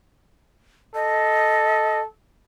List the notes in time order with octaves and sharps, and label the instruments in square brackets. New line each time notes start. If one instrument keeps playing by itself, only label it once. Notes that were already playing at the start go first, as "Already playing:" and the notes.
[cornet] A4 [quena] D#5